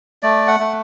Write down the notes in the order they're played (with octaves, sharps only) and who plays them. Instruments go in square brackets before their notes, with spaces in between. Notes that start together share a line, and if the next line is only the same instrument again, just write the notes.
[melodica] A3 D5
F#5
A3